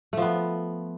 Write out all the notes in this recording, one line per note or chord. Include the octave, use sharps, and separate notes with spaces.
F3 A3 B3